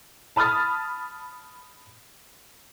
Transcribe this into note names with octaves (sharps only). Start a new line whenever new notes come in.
A5 B5 D#6 F6 A6